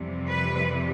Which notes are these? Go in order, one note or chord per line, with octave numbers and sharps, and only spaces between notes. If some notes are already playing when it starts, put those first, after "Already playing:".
Already playing: F2 C3 E3 G3
B4